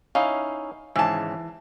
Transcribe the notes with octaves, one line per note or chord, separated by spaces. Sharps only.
C#4 D#4 E4 F5
G#1 G#2 C#3 E3 A5